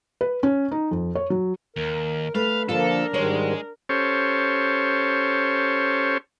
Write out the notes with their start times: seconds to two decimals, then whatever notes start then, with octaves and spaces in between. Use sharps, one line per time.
0.21 B4
0.43 C#4
0.71 D#4
0.91 F2
1.15 C#5
1.30 F#3
1.76 D#2 A#4
2.35 A3 B4 F5
2.69 D3 F3 A#3 D4 F4 A4 A#4
3.14 G#2 D#3 G3 G#3 C5 C#5
3.89 C#4 G4 A4 C5 C#5